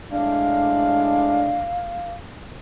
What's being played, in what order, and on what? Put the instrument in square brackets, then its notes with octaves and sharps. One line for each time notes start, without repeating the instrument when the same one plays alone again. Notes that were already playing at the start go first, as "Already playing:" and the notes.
[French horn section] A2 G#3 D4 [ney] F5